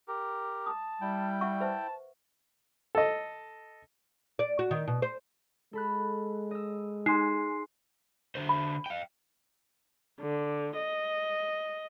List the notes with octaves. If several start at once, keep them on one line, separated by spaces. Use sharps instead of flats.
G4 A#4
A5 D#6
G3 E4 G5
E5 F#5 C#6
B4 C5 E5 A5
A4 D#5
D5
F#4
D#3
B2
C5
G#3 A4 B5 F#6
D#5 E6
D#4 G#4 C6 C7
D3 C5
B5
F5 G5
D3
D#5